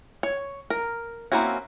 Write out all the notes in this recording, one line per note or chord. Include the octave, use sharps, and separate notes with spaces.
C#5
A#4
A#3 C4 C#4 E4 F#4